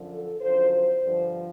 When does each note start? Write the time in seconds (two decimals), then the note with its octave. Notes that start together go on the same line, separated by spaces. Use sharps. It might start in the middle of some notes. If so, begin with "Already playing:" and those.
Already playing: F#2 D3 F3
0.12 A4
0.41 F#2 D3 F3 C5
0.71 C5
1.02 G2 D3 F3